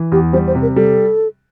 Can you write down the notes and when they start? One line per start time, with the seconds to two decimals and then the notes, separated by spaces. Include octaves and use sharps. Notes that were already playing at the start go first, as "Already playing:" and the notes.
Already playing: E3
0.12 E2 G4
0.33 G3 C5
0.47 C5
0.55 C3
0.62 A#4
0.76 G3 A4